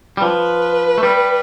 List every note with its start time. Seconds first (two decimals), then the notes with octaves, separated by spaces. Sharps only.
0.17 G3
0.22 F3 B4
0.98 A3
1.03 G3